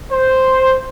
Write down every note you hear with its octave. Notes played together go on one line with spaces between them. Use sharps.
C5